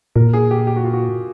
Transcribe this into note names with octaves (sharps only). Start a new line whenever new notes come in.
A#2 A#4
G#4
G4
G4
F#4
F4
F#4